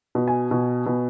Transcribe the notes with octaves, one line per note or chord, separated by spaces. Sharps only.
B2
G#5
B2
B2